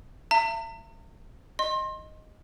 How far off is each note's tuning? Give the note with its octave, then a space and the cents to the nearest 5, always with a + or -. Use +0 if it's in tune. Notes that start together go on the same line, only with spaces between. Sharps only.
E5 +25 A#5 -45
D#5 +0 C6 +30